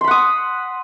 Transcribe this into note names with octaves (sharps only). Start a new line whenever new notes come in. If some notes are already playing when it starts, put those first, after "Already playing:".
F#5 B5 C6 D#6